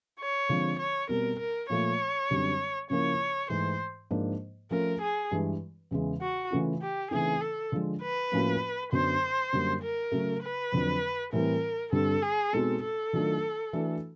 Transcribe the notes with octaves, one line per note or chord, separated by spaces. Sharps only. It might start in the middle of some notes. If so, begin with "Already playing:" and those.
C#5
D3 F3 G#3 C4 F4
C#5
B2 G3 C4 A#4
A#4
A#2 F3 A3 C#5
F#2 D3 G3 C4
C#3 F3 A#3 C#4 E4 C#5
G#2 E3 A3 C5
G#2 F3 A#3 D4
F3 A3 C#4 A#4
G#4
G2 E3 G#3
E2 C#3 E3 G#3
F#4
C#3 E3 A3 C#4 F4
G4
C#3 E3 A3 C4 D#4 G#4
A4
D3 F3 G#3
B4
A2 F3 A#3 C#4 F#4
F#2 D3 F#3 B3 C5
F#2 D3 G3 A#3
A#4
C#3 F#3 A3
B4
F2 D3 F#3
A2 E3 G3 C4 A#4
G2 D3 G3 C4 A4
G#4
B2 G#3 C4 D#4 F#4 A4
A4
D#3 F#3 A3 D4 F4
E3 A3 D4 F#4